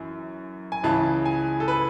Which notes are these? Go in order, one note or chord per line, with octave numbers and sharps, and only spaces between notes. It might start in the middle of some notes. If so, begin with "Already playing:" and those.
Already playing: F#2 E3
G#5
C#2 C#3 E3 A5
G#5
A4
B4